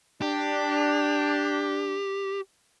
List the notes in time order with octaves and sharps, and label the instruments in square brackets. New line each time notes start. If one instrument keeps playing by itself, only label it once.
[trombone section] D4 [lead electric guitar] G4